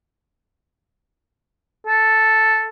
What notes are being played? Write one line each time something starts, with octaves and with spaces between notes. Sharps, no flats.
A4